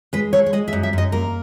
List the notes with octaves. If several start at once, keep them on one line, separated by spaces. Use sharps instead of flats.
G#3 B4
G#3 C#5
C#5
G#3 D#5
E5
F#2
E5
F#2 D#5
A#3 A#4